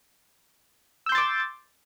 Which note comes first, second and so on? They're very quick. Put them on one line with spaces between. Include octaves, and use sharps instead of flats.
E6 G6 C6 A6 D6